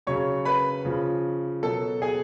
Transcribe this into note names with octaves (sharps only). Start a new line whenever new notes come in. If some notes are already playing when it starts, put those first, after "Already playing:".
C#3 F#3 C#5 C#6
B4 B5
C#3 F3
B2 F#3 A4 A5
G#4 G#5